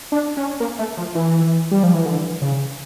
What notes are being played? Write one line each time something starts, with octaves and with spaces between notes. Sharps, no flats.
D4
C#4
A#3
A3
F3
E3
G3
F3
E3
D3
C#3